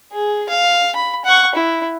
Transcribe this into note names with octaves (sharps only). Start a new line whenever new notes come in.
G#4
F5
B5
F#5 C#6
E4